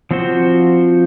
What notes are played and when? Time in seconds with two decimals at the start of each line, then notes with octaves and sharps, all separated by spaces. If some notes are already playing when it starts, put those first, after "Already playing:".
0.11 F3 C4 F#4 C5